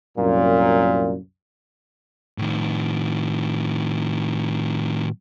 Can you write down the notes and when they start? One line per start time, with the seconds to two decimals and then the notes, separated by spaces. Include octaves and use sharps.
0.17 C2 F#2 A#2
2.38 A2 D#3